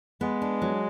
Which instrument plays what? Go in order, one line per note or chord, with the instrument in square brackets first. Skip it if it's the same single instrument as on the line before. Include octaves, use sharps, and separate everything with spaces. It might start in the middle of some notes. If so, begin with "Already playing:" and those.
[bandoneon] G#3 [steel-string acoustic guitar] B3
[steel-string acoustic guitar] D4
F#3